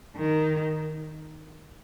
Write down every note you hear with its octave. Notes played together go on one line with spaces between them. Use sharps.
D#3